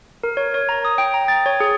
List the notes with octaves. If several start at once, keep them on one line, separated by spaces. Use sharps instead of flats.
A#4
C#5
C#5
A#5
D#6
G5
A#5
A6
C#5
G#4